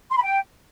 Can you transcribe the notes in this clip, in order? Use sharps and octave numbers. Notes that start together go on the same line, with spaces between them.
C6
B5
G5